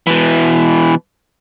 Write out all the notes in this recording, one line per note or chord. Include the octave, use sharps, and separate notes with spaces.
B2 E3